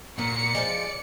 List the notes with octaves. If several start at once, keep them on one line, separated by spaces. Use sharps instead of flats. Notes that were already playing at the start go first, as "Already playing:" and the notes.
A#2 A#3 F#4 C#7
F3 F#3 G#3 D5